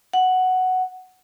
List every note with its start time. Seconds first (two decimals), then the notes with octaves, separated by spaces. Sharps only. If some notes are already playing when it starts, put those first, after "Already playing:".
0.13 F#5